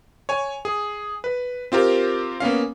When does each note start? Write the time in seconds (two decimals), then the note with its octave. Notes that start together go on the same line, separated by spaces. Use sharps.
0.29 C#5 G#5
0.65 G#4
1.24 B4
1.72 C4 F4 G4 A#4
2.40 A#3 B3 C#4 F5